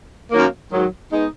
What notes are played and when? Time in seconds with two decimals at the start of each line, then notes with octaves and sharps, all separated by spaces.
0.32 F#2 D#3 F#3 A#3
0.72 G#2 D#3 F#3
1.13 G#3 B3 D#4